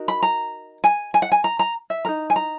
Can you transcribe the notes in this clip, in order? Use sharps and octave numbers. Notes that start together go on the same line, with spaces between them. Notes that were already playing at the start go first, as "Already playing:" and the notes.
Already playing: D#4 F#4 A#4
B5
A#5
G#5
G#5
F#5
G#5
A#5
A#5
E5
D#4 A#4 A#5
G#5
A#5